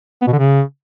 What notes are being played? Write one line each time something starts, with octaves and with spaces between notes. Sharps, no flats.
B3
B2
D3
C#3